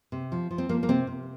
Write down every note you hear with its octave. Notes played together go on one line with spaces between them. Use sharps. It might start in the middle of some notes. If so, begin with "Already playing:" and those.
C3
F3
F3
C4
F3 A#3
A#3
C3 C4
C3